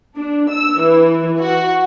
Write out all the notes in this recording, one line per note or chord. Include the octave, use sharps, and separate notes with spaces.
D4
E6
E3
F#4